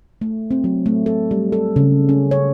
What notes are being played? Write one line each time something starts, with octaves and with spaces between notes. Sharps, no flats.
A3
C4
F#3
A3
A4
G3
A4
C#3
C#4
C#5